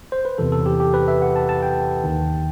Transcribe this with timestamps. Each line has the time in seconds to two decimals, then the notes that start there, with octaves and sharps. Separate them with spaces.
0.12 C5
0.25 B4
0.38 E2 C3 E3 A4
0.52 A4
0.66 G4
0.80 G4
0.94 B4
1.08 E5
1.22 F#5
1.36 A5
1.49 A5
1.63 G5
2.04 D#2 D#3